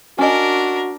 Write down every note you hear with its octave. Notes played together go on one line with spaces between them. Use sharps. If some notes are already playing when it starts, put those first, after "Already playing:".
C#4 D4 F#4 A#4 D#5